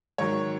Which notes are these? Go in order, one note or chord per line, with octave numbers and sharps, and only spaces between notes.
G#2 D#3 F#3 C#5